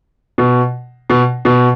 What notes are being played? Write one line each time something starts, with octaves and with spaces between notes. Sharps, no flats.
B2
B2
B2